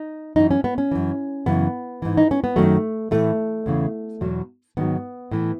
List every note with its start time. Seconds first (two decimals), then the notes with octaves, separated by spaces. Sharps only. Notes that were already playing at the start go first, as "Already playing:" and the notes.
Already playing: D#4
0.36 F#2 E3 D#4
0.51 C#4
0.64 B3
0.78 C#4
0.91 F#2 E3
1.46 F#2 C#3 E3 B3
2.02 G#2 E3
2.17 D#4
2.31 C#4
2.44 B3
2.56 F#2 D#3 F#3 A3
3.11 A2 E3 A3
3.66 E2 C#3 E3
4.21 E2 B2 F#3
4.77 G#2 D#3 F#3 B3
5.31 A2 E3